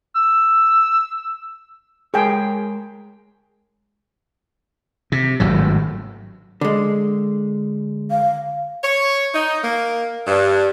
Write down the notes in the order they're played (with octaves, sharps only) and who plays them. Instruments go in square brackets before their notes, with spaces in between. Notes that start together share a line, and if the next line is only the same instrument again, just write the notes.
[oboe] E6
[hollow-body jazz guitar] G#3 A#4 C#5 [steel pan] G#4 G5
[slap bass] C3
G#1 A2 F#3
[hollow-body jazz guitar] D3 G#3
[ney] F5
[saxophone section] C#5
D#4
A#3
G2